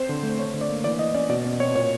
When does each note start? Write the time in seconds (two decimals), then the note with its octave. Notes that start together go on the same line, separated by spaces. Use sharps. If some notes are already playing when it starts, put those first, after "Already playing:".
Already playing: C4 C5
0.09 D3
0.23 A3
0.39 D3 C#5
0.54 D3
0.61 D5
0.69 A#3
0.84 E3 D5
0.99 E3 D#5
1.15 C#4 D5
1.29 B2 D5
1.45 B2
1.60 C4 C#5
1.75 A#2 C#5